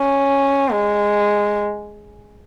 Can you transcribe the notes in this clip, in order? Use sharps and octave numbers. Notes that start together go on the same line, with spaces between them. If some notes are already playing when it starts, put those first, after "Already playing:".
Already playing: C#4
G#3